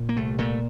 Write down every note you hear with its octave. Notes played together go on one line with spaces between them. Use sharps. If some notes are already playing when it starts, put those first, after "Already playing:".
Already playing: A#2
A#3
C2 A3
A#2 A3